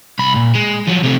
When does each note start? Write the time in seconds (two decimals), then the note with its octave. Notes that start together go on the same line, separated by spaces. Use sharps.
0.19 C2 B5
0.36 A#2
0.55 G#3
0.88 F3 F#3
1.04 C3 A3